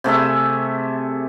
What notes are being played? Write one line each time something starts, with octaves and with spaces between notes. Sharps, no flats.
C3 A3 G#4 E5